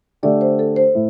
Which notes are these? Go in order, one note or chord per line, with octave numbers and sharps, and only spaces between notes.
D3 A3 D4 G4 D5
C5
A4
C5
A2